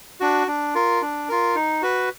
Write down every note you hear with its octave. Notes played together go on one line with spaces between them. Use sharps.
D4 F#4
D4
F4 A#4
D4
F4 A#4
D#4
F#4 B4